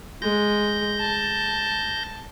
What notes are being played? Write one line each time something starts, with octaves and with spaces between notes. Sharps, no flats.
G#3 G6 A#6
A5